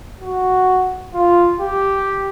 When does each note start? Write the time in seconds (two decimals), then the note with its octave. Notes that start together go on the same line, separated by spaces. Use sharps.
0.21 F#4
1.14 F4
1.61 G4